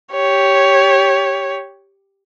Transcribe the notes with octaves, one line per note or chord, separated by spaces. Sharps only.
G4 C#5